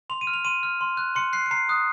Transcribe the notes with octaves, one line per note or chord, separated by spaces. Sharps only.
C6 F7
D#7
F6
F7
C6 D#7
F6
C6
F#6
C6 C#7
F#6 C7
C#7
A#5 C7
D#6 F#6